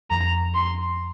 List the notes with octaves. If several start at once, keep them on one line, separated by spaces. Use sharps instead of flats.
F2 A#5
C6